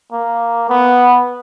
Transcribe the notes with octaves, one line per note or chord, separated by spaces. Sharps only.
A#3
B3